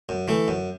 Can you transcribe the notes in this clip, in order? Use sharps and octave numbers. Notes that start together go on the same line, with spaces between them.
F#2
E3 A3
F#2